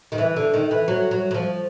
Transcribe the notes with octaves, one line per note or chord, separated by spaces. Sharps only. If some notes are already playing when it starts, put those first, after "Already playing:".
D#3
E3
D3
D#3
E3
F#3
F#3
F#3
F3